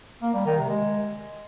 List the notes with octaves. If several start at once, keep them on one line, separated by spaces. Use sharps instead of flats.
A#3
G3
D#3
C3
G#3